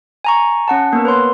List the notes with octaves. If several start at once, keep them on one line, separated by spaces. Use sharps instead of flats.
G#5 A#5 C#6
C#4 F#5 A5
A#3 B3 A#4
B4 C#5 C6